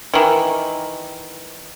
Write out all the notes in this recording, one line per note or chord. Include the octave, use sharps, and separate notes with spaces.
D#3 E3